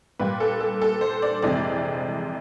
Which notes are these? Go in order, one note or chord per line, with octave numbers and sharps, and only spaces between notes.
A#2 G3 A#3 B4
A4
A4
A4
C5
D5
F2 C3 E3 G#3 C4 D5